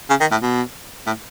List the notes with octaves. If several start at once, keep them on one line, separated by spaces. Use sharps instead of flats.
C#3
D#3
A2
B2
A2